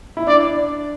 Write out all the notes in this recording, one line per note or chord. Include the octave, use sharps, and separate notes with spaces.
E4
D4 D5